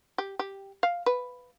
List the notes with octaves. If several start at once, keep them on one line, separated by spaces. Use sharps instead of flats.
G4
G4
F5
B4